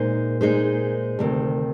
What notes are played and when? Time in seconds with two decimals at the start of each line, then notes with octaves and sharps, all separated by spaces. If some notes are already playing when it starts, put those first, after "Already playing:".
Already playing: A#2 G#3 D#4 G#4 C5
0.41 A#2 G#3 D#4 G#4 C5
1.19 D2 C3 D#3